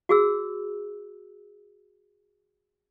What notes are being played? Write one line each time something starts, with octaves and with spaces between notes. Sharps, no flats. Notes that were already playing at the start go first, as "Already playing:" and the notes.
F#4 G#4 E6